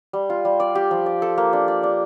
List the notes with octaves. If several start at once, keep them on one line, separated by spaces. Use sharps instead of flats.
G3
F4
G3
D5
G4
F3
D5
A4
A#3
D4
D5
D4